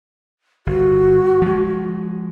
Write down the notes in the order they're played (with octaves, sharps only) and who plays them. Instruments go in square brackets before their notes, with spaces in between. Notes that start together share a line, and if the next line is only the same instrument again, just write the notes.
[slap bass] G1 [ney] F#4
[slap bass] F3 G#3